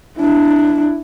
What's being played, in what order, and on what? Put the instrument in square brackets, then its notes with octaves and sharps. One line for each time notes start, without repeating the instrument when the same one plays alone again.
[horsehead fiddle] D4 E4